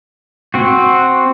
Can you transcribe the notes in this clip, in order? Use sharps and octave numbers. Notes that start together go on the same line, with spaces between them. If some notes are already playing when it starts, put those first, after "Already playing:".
C4 F#4